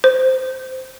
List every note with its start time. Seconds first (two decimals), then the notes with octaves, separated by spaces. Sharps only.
0.04 C5